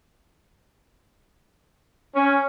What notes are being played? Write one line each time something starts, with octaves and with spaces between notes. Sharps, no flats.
C#4